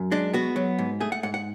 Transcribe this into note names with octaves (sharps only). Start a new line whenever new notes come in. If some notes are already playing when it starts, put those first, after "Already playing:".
Already playing: F#2
G#3 D4
B3 F#4
F#3
G#2
A3 G#4
F#5
G#2 F#5
F#5